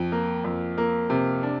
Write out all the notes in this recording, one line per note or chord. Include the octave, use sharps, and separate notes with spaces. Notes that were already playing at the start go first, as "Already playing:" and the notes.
Already playing: F2
A#3
F2
A#3
C3
D4